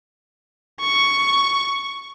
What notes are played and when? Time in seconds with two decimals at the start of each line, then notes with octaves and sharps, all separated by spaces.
0.81 C#6